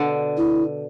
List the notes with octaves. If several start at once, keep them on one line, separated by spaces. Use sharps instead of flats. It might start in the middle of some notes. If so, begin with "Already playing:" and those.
Already playing: B2 D3
E4